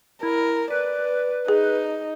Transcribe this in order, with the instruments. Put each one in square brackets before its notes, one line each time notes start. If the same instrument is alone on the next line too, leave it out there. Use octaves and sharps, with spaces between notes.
[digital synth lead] E4 [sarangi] A#4
[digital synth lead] B4 [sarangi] D5
[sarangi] D#4 [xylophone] G#4